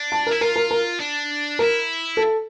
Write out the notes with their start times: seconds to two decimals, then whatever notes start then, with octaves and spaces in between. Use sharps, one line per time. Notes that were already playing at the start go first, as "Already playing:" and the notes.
Already playing: D4
0.12 A5
0.27 A#4
0.31 E4
0.41 F4 A#4
0.56 A#4
0.71 A#4
1.00 D4
1.59 E4 A#4
2.17 A4